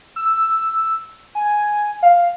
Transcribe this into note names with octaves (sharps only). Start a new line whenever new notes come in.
E6
G#5
F5